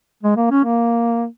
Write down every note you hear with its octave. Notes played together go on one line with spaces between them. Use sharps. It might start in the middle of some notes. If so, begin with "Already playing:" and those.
G#3
A#3
C#4
A#3